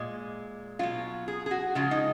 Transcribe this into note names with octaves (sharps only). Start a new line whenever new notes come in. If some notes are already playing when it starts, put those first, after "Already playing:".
Already playing: A#2 G#3
B2 F#3 F4
G#4
G#4
F#4
C#3 F3 G#3 F4
D#4